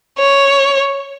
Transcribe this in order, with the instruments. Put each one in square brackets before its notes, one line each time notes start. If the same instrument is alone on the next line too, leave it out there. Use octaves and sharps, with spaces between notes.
[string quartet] C#5